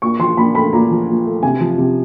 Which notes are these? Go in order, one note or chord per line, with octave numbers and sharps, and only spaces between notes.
A#2 C#6
F3 C6
A#2 B5
A3 B5
A#2 A#5
F3
A#2
A3
C3 G#5
F3
C3